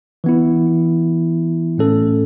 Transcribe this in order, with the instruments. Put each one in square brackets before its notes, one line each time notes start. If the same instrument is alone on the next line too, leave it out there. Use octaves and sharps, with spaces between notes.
[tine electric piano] E3 B3 E4
A2 A3 C#4 A4